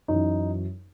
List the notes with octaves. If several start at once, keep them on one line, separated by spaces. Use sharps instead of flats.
F#2 E3 D#4